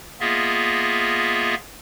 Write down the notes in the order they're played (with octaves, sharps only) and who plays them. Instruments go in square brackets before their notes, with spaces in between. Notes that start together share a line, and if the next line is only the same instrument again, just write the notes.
[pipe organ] A#3 B3 F4 G#4 D#5 E5